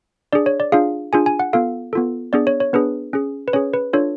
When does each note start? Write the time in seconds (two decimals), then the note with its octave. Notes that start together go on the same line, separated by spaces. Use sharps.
0.33 D4 G#4 D5
0.46 C#5
0.60 D5
0.72 D4 F4 G#4 F5
1.13 D4 F4 G#4 G#5
1.26 G#5
1.39 F#5
1.53 B3 F4 A4 F5
1.93 B3 F4 A4
2.33 B3 D4 G#4 D5
2.47 C#5
2.60 C#5
2.73 B3 D4 G#4 B4
3.13 C#4 G#4
3.48 B4
3.53 C#4 G#4 C#5
3.74 B4
3.93 D4 F4 A4 C#5